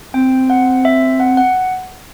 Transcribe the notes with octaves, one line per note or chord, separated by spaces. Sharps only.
C4 G5
F#5
E5
F#5
F#5